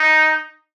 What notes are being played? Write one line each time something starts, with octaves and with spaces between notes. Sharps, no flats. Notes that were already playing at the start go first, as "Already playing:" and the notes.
Already playing: D#4